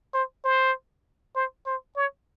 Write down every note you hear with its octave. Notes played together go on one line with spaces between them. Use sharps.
C5
C5
C5
C5
C#5